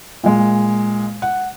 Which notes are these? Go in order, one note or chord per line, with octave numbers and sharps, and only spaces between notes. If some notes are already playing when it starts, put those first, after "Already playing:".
A#2 G#3
F#5